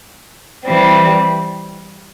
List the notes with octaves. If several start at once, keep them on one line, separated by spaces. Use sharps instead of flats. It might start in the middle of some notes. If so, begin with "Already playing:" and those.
E3 G3 C4